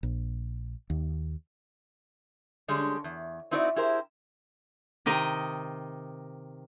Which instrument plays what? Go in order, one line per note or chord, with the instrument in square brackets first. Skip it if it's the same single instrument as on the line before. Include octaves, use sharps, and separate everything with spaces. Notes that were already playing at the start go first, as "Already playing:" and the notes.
[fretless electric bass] A#1
D#2
[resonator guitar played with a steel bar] D3 G3 G#3 C#4
E2
C4 D#4 E4 F#4 A#4 D5
E4 G4 G#4 A#4 C5
[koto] C3 D#3 D#5